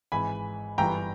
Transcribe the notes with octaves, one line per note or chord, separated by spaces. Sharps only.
G#1 G#2 E3 G#5 B5
G1 G2 E3 G5 A#5